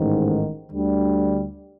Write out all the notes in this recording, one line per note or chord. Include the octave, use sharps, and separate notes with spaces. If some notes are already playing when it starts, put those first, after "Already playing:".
Already playing: A1 G#2 D#3
D2 D3 G3